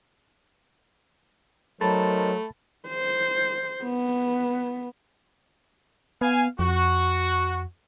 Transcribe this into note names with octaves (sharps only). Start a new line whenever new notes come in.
F#3 A3 D#4 A#4 C5 A5 B5 A6
C5
B3
B3 F5 G#5
F2 F#4